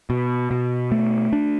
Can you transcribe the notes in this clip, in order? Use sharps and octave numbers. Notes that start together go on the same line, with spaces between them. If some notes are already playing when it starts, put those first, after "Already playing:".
B2
B2
A3
D4